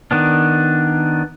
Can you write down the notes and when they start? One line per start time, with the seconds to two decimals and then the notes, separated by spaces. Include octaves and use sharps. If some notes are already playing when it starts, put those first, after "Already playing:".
0.11 D#3 B3 D4